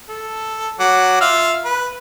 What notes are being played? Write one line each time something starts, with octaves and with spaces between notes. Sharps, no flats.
A4
F#3 F#5 D6
F4 E5 F5
B4